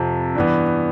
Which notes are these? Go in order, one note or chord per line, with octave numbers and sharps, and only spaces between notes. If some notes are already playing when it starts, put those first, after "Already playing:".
Already playing: F2 C3 F3
G2 E3 B3